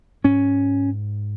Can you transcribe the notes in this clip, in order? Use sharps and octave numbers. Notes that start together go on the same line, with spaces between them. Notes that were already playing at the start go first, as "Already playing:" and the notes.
G#2 C#4